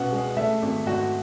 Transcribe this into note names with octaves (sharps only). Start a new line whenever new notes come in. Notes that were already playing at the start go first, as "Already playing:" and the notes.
Already playing: C#2 B2 F#5
G#3
A3 E5
G#1
G#2 F#4